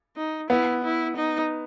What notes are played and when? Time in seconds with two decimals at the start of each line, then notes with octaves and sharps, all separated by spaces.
0.17 D#4
0.50 B3 E4
0.84 E4
1.16 D#4